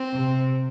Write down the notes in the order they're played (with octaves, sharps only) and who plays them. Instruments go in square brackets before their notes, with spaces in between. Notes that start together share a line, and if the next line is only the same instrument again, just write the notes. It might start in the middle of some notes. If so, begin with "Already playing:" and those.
Already playing: [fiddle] C4
[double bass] C3